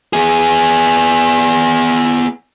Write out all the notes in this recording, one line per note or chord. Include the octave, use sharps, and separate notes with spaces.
B3 G#4